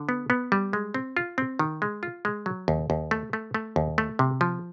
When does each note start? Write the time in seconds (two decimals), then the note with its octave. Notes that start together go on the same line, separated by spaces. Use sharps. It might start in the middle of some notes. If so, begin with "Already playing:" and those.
Already playing: D3
0.09 B3
0.30 B3
0.52 G3
0.73 G#3
0.94 C4
1.17 F4
1.38 C4
1.59 D#3
1.82 G#3
2.03 F4
2.25 G#3
2.46 F#3
2.68 D#2
2.90 D#2
3.11 A3
3.33 A3
3.54 A3
3.76 D#2
3.98 A3
4.19 C3
4.41 F3